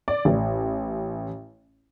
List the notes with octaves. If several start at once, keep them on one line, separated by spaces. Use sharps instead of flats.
D5
A1